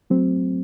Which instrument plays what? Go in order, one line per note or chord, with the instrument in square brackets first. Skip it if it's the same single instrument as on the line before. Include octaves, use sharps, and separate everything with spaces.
[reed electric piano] F#3 A3 C4